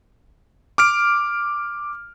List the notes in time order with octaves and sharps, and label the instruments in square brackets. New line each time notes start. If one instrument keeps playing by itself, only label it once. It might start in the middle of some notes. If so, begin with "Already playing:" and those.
[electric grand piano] D6 F6 D7